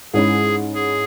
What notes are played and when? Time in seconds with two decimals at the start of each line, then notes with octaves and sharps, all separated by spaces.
0.13 G#2 G#3 C#4 E4 G#4
0.74 G#4